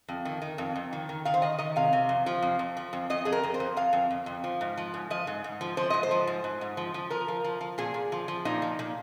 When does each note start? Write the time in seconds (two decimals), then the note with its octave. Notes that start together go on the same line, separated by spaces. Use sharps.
0.08 F2
0.25 D#3
0.42 D#3
0.58 F2
0.76 F2
0.93 D#3
1.09 D#3
1.25 D#3 F5
1.34 C5
1.42 D#3 D#5
1.59 D#3 D#5
1.76 C3 F5
1.93 C3
2.09 F2
2.26 F3
2.42 F2
2.59 F2
2.77 F3
2.93 F2
3.10 F2 D#5
3.25 F2 G#4
3.32 A#4
3.43 F2
3.54 C5
3.60 F2
3.77 F2 F5
3.93 F2
4.11 F2
4.26 F2
4.44 F3
4.61 G#2
4.77 F3
4.94 G#2
5.10 F3 D#5
5.27 G#2
5.44 G#2
5.61 F3
5.77 F3 C5
5.90 G#2 D#5
6.03 C5
6.11 F3
6.27 G#2
6.44 G#2
6.61 G#2
6.77 F3
6.94 F3
7.10 F3 A#4
7.28 F3
7.44 F3
7.61 F3
7.78 A#2 G#4
7.94 A#2
8.12 F3
8.28 F3
8.45 A#2 D#4
8.62 F3
8.79 A#2